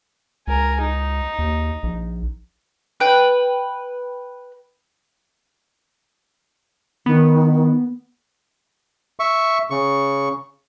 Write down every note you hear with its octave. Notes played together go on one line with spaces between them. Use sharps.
C#2 A#4 G#5
D#4
D#2
A#1
B4 G5
D#3 B3
E5 C#6
C#3 C#6